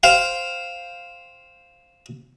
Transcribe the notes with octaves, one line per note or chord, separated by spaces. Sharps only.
C5 F5 G5